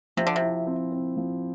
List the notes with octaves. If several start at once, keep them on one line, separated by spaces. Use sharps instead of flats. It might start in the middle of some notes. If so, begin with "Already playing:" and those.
C3 F3
D3
C3
E4
C4
C4
F3